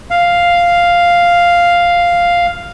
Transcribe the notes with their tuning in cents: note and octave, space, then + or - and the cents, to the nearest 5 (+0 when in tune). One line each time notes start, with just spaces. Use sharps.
F5 +0